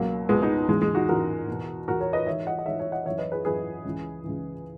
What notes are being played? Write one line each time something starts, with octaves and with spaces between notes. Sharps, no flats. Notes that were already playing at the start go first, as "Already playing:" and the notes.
Already playing: C#2 B2 F#3 A#3
C#2 B2 G#3 B3
B3 D#4
E2 C#3 E3 G#3
G#3
D#4 F#4
E2 C#3 E3 F#4 A#4
E2 B2
E2 B2 F#4 A#4
A#4 C#5
B4 D#5
G#2 E3 C#5 E5
D#5 F#5
D#5
G#2 E3 C#5 E5
C#5 E5
D#5 F#5
F#2 E3 C#5 E5
B4 D#5
G#4 B4
F#2 E3 G#4 B4
C#2 C#3 E3
C#2 C#3 E3